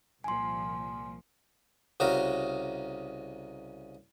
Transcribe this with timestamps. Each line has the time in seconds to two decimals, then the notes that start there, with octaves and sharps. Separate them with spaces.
0.24 C2 A#2 F3 G#5 C6
2.00 C2 C#3 F#4 A#4